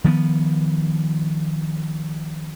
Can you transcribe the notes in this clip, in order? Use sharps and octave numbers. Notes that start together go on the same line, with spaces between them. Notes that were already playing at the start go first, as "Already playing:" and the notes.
D#3 F3 A#3 B3